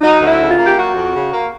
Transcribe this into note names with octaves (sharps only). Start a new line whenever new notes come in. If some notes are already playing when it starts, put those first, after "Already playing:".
F#3 D#4
D2
E4
C#3
F4
A#3
G4
F#3 F#4
F2
C#3
A#3